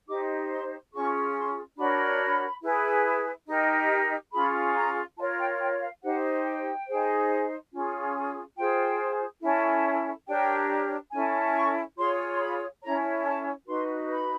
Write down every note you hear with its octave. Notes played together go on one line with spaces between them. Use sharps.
D#4 G4 C5 D6
C6
C#4 F4 G#4 C#6
C6
D4 F#4 A#4 C#5 B5
E4 G#4 B4
D#4 G4 A#4
C#4 F4 G#4 B5
A#5
F4 A#4 C#5 A5
G5
G5
F5
D#4 G4 C5 F#5
G5
D#4 G#4 C5
C#4 F4 G#4
F4 G#4 C5 G5
C#4 E4 A4
D4 G4 A#4 C#5 G5
C#4 E4 A4 G#5
C#6
F4 G#4 C#5 C6
C6
B5
C#4 E4 A4 C#5 A#5
A5
D#4 F#4 B4 C6
B5